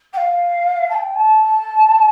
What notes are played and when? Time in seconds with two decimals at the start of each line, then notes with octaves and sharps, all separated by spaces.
0.13 G5
0.17 F5
0.90 A5
0.94 G5
1.15 A5